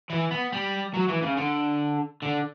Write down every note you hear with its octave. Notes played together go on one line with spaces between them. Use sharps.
E3
B3
G3
F#3
E3
C#3
D3
D3